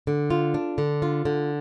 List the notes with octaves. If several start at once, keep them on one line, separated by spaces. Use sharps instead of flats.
D3
F4
D4
D3
F4
D3